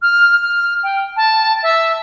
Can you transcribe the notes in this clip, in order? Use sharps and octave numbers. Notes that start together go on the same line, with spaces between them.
F6
F6
G5
A5
E5